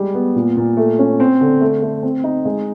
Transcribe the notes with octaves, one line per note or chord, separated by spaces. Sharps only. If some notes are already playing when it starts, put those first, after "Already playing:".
Already playing: G3 G#3
B3
A#2
A#2
A3
C#4
C4
D3
A3
A3
C4
D#4
G#3